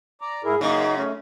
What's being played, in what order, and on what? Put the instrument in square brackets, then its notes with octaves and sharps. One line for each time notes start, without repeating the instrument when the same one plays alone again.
[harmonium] D5 A#5
[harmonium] G#2 E4 A#4 [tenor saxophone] G#4
[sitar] F#2 C#3 [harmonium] A#3 [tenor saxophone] D#4
[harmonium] A3 [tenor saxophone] C#4